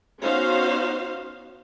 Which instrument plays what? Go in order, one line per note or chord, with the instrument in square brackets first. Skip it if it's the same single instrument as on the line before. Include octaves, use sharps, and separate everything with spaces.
[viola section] B3 C#4 D#4 F#4 C5 F5